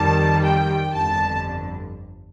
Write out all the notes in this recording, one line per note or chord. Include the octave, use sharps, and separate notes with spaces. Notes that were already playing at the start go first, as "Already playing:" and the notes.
Already playing: F2 D#3 G3 A5
G5
G1 F2 D3 A5